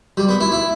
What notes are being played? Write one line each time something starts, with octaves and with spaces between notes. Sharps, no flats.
G3
B3
E4
E4